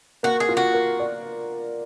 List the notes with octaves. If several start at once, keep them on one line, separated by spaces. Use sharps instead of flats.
A#3 F#4
G#4
F4
F#4
A#4
D5